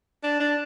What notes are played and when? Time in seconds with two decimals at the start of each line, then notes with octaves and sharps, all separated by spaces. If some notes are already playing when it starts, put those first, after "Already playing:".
0.24 D4
0.40 D4